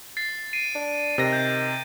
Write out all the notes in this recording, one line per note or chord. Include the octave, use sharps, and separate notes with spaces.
A6 C7
C7 D7 D#7
D4
C3 D#3 A#6
G6